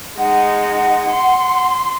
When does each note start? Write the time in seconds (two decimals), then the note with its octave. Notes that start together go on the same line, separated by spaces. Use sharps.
0.18 G#3 D#4 F#5
1.10 C6